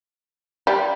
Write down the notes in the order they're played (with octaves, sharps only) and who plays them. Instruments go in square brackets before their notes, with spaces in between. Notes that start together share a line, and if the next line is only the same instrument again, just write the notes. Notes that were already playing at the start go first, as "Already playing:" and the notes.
[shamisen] G3